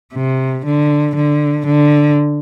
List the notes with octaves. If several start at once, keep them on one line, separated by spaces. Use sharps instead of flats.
C3
D3
D3
D3